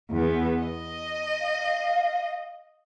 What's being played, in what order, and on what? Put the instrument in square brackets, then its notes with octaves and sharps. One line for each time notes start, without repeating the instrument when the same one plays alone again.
[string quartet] E2 B3
D#5
[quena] F5